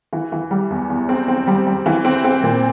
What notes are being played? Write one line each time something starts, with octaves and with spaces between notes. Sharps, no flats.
E3
E3
G3
E2
E2
C4
C4
G3
G3
E3
C4
C4
A#2